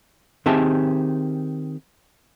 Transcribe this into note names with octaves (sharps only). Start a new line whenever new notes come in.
D#3 C4 G4 G#4 E5 A5